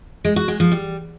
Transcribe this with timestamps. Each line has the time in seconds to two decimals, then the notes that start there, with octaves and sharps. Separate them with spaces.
0.25 G#3
0.36 F#4
0.48 G#3
0.60 F3
0.72 G3